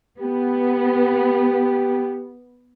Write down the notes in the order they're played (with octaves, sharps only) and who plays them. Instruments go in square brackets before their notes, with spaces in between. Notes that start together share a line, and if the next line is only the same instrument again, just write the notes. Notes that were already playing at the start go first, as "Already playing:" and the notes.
[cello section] B3 [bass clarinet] G4